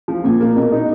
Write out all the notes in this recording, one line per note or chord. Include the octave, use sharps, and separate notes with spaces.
F3
A#2
A#3
B2
D#4